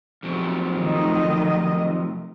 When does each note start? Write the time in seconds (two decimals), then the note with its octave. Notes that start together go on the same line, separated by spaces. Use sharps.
0.23 F2 C3 F#3
0.76 D#3 A3 D#5